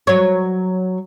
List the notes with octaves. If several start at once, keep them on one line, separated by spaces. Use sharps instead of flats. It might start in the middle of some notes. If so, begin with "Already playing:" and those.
F#3 C#5